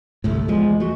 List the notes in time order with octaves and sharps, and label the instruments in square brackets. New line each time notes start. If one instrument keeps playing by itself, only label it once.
[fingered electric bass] G1 C2 A2 [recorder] A3
[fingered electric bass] E2 F3 [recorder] G#3
[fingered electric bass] A3 [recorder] F#4